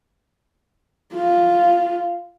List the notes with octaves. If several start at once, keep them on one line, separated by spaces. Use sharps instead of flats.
F4